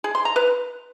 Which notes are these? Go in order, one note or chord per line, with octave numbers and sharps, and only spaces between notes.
G#4
C6
A#5
B4